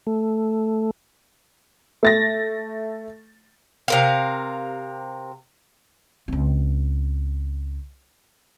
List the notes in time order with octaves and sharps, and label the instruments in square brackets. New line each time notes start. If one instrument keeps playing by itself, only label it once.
[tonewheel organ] A3
[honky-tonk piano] A3 A6 A#6
[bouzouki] C3 A#4 F5
[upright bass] C#2 C4